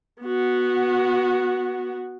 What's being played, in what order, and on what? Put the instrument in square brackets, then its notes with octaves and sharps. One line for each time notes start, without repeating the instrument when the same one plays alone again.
[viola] B3 F#4